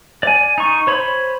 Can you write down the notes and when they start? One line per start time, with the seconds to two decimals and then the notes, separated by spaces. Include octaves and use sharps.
0.23 D5 G#5
0.58 D#4 C#6
0.87 C5 C#5 B5